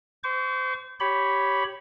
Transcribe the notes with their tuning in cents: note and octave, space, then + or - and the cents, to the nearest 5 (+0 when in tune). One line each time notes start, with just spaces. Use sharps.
C5 -25 C#6 +35
G4 -10 C#5 +0 B5 +0